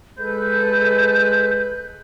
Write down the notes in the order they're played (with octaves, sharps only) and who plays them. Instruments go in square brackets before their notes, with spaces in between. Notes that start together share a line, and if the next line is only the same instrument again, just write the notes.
[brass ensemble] G#3 B4 [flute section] A4 G6